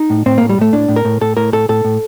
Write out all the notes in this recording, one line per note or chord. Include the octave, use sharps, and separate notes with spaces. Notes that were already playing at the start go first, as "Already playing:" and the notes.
Already playing: D#4
A2
A2 C4
A2 A#3
G3
A2 A3
A2 D4
A2
A#4
A2
A2 A4
A2 A#4
A2 A4
A2 A4
A2